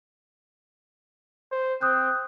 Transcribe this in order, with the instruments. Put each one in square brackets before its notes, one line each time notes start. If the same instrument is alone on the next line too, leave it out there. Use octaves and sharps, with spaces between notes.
[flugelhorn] C5
[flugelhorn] C4 [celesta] D#6 F#6 G6